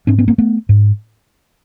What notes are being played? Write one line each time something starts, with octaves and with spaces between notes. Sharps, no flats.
G#2 C4 D4
B3 C#4
A#3 C4
A3 B3
G#2